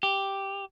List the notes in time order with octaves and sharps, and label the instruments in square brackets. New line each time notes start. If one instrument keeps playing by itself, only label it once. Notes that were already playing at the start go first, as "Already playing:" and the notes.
[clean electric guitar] G4